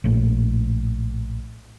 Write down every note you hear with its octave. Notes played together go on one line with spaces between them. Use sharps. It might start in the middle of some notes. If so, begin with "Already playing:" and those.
A#1 A2